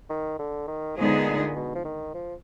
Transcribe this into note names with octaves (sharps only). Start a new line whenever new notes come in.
D#3
D3
D#3
D3 F3 G#3 B3 D#4 G#4
A#2
A#2
B2
F3
D#3
F3